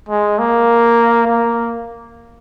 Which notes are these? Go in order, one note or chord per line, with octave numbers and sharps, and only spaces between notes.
G#3
A#3
A#3